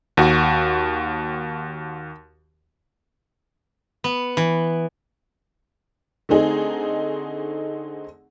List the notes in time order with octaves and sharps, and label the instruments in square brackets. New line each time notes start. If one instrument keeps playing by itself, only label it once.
[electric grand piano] D#2 F#4
[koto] B3
E3
[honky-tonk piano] D3 A3 C4 D#4 G#4